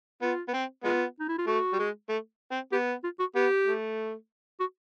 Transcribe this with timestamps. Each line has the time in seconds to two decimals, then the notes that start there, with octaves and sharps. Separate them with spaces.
0.22 B3 F4
0.48 B3
0.54 C4
0.84 G#3 B3 F4
1.20 D#4
1.29 E4
1.38 F4
1.47 A3 F#4
1.73 G3
1.79 G#3
2.09 A3
2.52 C4
2.72 B3 G4
3.04 F4
3.20 F#4
3.35 B3 G4
3.66 A3
4.60 F#4